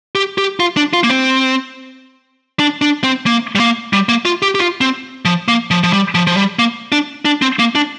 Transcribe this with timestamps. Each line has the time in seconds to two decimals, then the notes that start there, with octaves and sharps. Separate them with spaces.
0.15 G4
0.38 G4
0.60 F4
0.77 D4
0.93 F4
1.04 A#3
1.09 C4
2.60 D4
2.82 D4
3.04 C4
3.26 A#3
3.55 G3
3.60 A#3
3.93 G3
4.09 A#3
4.25 F4
4.42 G4
4.55 G4
4.59 F4
4.81 C4
5.25 F3
5.48 A#3
5.71 F3
5.84 F3
5.93 G3
6.15 F3
6.27 F3
6.37 G3
6.59 A#3
6.92 D4
7.25 D4
7.42 C4
7.59 A#3
7.75 D4